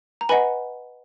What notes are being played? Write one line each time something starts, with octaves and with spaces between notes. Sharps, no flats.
A#5
B4 D#5 F#5 G#5 B5